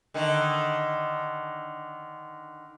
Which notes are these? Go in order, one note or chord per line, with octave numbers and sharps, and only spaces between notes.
D3 D#3 D#4